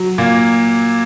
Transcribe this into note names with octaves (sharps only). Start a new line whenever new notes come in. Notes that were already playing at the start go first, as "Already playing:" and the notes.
Already playing: F#3
A#2 A#3